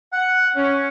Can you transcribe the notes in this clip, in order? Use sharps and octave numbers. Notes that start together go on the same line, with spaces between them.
F#5
C#4